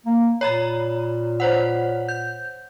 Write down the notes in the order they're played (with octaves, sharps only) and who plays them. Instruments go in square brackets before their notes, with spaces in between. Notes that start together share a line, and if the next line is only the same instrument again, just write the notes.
[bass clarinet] A#3
[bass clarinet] A#2 [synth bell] C#5 A#5 B5
[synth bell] C5 C#5 F#5
G6